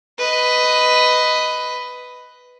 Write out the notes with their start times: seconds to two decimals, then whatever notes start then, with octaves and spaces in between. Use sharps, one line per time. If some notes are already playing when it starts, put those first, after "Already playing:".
0.19 B4 D#5